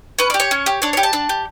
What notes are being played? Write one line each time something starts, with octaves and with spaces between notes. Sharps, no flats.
C#4 B4
G4 D5
C#5
C#4
G4
D4 C#5
G4 C#5
A5
D4
G4